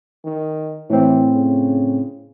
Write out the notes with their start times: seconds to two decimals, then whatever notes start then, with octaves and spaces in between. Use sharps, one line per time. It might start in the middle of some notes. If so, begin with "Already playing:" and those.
0.24 D#3
0.90 A2 E3 C4
1.35 C#3